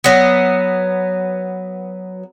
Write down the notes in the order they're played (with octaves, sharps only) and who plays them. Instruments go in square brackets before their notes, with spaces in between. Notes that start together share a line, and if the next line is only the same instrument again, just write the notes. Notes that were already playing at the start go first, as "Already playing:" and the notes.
[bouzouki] F#3 B3